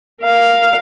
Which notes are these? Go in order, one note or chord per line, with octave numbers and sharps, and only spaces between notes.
A#4 F5